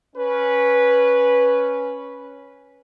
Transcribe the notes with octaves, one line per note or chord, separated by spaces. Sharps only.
C#4 B4